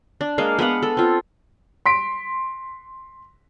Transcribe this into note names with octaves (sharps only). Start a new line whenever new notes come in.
D4
G#3 A#3 F5
B3 B4 F5 F#5
A4
C4 F4
C6 B6 D7